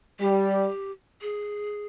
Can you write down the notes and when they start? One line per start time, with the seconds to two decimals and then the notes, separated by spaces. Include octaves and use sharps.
0.20 G3 G4
1.22 G#4